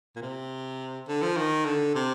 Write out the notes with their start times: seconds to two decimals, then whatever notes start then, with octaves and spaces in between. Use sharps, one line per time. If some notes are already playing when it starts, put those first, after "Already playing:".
0.16 A#2
0.22 C3
1.08 D3
1.22 F3
1.36 D#3
1.65 D3
1.95 C3